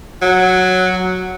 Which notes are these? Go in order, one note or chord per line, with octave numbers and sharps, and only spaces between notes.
F#3